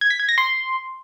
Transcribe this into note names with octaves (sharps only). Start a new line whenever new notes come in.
G#6
B6
G#6
A#6
C6